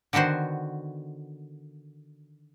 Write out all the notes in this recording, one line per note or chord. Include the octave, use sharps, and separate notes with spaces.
D3 D#3 B3 F#4 C5